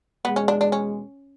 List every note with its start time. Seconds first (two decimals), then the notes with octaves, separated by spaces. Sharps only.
0.24 E2 B2 G#3 B3
0.36 C#4
0.48 D4
0.61 D4
0.72 C#4